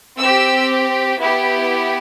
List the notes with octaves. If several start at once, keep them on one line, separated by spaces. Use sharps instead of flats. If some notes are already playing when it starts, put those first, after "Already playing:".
C4 G4 E6
B3 E4 G4